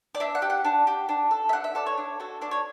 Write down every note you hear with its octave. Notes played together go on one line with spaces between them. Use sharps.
D5
D4 E5
F#5
G4
F#5
D4
G4
D4
A4
E5
D4 F#5
E5
A4 D5
C#5
D4
F#4 A4
D4 D5
C#5